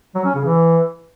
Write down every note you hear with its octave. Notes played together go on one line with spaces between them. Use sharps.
F#3
C#4
C#3
E3